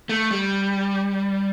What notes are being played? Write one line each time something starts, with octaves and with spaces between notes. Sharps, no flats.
A3
G3